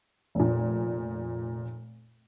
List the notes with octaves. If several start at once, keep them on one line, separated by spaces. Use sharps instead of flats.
F1 A#2